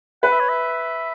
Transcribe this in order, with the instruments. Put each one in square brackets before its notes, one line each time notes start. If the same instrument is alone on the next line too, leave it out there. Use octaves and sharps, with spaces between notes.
[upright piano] B4 [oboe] F#5
[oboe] E5
C#5
E5